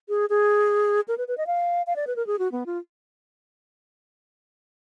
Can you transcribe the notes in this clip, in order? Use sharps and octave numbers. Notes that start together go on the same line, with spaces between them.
G#4
G#4
A#4
B4
B4
D#5
F5
F5
D5
B4
A#4
G#4
F#4
B3
F4